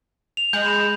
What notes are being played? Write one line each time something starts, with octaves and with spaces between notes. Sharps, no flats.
F7
G#3 G6 F#7
B5 E7 F7